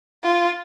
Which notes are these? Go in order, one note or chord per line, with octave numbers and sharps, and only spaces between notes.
F4